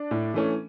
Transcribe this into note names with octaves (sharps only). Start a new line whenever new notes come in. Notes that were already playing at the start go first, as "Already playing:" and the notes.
Already playing: D4
A2
E3 A3 C#4